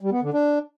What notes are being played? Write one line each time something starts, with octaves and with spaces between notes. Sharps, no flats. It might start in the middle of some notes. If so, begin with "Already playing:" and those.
G3
B3
D3
D4